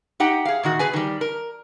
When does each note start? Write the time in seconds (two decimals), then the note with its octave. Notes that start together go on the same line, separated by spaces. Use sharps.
0.20 D#4 G4 F#5 G5
0.45 G#4 F5
0.63 A#2 D#3 F#4
0.79 G#4 B4 G#5
0.93 D#3 G3
1.21 A#4